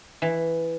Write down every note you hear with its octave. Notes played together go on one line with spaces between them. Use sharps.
E3